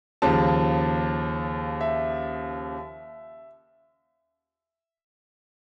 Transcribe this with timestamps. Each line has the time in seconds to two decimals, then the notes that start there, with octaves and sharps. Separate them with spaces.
0.22 D#2 C#3 F3 A5
1.81 E5